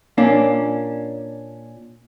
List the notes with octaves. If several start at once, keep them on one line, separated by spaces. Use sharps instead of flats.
A#2 A#3 C#4 D4